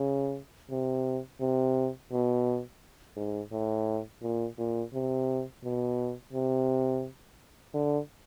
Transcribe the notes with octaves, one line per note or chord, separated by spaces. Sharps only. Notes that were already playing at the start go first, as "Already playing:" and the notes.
Already playing: C#3
C3
C3
B2
G#2
A2
A#2
A#2
C3
B2
C3
D3